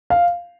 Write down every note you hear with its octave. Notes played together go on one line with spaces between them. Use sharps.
F5